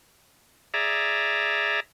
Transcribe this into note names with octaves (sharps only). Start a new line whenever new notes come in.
G#4 D5 E5 A#5